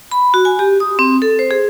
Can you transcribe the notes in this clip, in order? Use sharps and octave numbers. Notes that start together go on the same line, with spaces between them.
B5
F#4
G#5
G4
D#6
C4
A4
C5
G#4